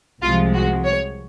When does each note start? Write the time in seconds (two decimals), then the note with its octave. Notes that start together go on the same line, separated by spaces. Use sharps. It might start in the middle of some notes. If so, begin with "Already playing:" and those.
0.22 C2 C3 F3 G#3 F4
0.54 F#4
0.85 C#5